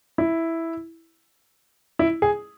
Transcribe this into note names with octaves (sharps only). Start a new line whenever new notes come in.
E4
E4
G#4